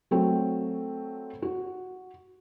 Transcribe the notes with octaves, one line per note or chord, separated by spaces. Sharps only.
F#3 A3 C4 F#4 A4
F#4